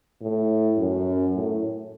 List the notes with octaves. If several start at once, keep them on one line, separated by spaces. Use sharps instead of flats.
A2
F#2
A2